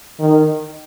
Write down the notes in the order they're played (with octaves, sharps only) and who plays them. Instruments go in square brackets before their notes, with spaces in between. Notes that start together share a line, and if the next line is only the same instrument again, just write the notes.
[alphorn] D#3